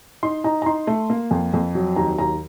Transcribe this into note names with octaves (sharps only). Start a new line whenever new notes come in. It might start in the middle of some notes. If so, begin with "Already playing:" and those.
D#4 C6
D#4 A#5
A#5
D#4 C6
A3
A#3
F2
F2
F#3
D#2 A#5
D#2 A#5